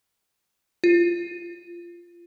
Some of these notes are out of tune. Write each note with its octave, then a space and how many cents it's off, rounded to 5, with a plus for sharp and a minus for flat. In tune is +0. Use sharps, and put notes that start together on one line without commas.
F4 -20